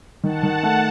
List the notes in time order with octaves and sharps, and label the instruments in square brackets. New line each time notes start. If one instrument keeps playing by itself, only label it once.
[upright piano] D#3 [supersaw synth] F#5 A5
[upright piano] D#3
A3